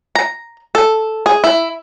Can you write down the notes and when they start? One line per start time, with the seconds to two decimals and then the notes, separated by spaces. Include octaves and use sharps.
0.15 A#5
0.75 A4
1.26 G#4
1.44 E4